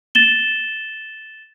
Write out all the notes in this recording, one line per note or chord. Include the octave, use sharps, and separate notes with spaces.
A6 E7 G7